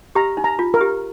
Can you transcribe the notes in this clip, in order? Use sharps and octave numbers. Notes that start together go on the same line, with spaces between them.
G4 A#5
D#4
A#5
F4
A#4
G4